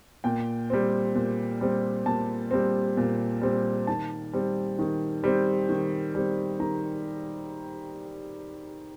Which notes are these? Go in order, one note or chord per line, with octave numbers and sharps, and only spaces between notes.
A#2 G5
G3 C4
A#2
G3 C4
A#2 A5
G3 C4
A#2
G3 C4
D#3 A5
G3 C4
D#3
G3 C4
D#3
G3 C4
D#3 A#5